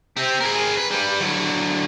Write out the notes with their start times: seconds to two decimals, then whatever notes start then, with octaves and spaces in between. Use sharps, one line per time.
0.16 C4 G4
0.40 G#4 A#4
0.77 B4
0.91 G3 B4
1.21 D3 F#3